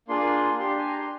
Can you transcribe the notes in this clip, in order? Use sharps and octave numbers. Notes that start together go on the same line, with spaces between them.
A#3 D4 F4 G#4 C6
D4 G4 C6
G#5
A#5
C6